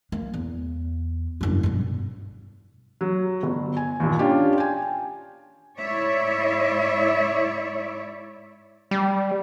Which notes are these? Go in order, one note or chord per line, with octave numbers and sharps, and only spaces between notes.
A#3
E2
F#1 G2
G2 B2
F#3
G1
G#5
D#2 A#2
C#4 D4 F4 G4
G5 G#5
G#2 E4 C#5 D5 E5
G3